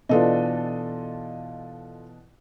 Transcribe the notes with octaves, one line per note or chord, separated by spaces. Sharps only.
B2 E3 D4 F4 A4 D#5